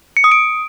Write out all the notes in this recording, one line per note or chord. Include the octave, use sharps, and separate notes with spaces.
C#7
D#6
D7